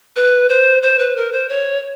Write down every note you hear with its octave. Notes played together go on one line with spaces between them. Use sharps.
B4
C5
C5
B4
A#4
C5
C#5